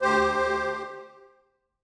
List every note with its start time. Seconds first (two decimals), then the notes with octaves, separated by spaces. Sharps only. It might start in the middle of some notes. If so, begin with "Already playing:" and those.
0.02 D2 G4 C5
0.21 D2
0.40 D2
0.60 D2